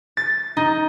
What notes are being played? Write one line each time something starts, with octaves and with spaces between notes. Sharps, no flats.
A6
D#4